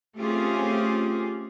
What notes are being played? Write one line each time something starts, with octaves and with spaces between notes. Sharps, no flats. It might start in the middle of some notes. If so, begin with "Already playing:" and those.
A3 C4 C#4 F4 G4 G#4